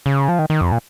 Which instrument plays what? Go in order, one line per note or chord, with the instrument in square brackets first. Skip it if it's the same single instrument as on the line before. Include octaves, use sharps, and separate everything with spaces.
[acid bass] C#3
F3
D#3
D#3
F2
A#2